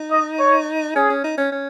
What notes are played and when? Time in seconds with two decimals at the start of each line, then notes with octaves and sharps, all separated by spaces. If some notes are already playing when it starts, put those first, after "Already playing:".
Already playing: D#4
0.11 D#5
0.39 C#5
0.95 C#4 G#4
1.09 C#4
1.24 D#4
1.37 C#4
1.52 C#4